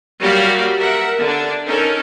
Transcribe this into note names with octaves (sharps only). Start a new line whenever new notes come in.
F#3 G3 A#3 F#4 G4 F5
A#4 E5 F#5
D3 D4
C#4 D#4 A4 A#4